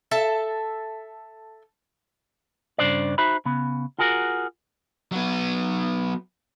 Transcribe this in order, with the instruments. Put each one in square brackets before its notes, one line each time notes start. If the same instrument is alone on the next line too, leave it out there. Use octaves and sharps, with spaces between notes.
[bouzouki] A4 E5 A5
[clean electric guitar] G2 C#3 E3 D4 C5 D5
D#4 F#4 C5 E5 B5
C#3 B3
F4 F#4 G#4 A#4 F#5
[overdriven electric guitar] F#3 B3